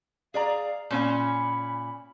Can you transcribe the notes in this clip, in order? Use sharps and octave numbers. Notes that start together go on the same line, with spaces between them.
G#4 D5 F5 A#5
A#2 C#4 G#5 B5